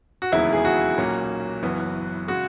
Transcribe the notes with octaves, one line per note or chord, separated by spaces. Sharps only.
F#4
E1 D#2 C#3 F#3 B3 E4
G#4
F#4
B1 A#2 A#3 C#4
F#1 F#2 E3 B3
C#3 G#3 F#4